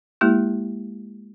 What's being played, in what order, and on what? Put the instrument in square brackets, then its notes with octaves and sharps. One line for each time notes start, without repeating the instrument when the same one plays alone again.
[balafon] G#3 A#3 E4 G4